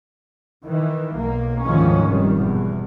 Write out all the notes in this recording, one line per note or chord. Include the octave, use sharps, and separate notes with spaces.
D#3 E3
B1 A#3
D2 G#2 D#3 F3 C#4
F1 D#3 G3
E2 B2